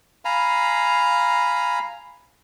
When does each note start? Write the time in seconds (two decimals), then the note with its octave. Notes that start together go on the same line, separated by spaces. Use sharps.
0.25 F5 G#5 A#5 B5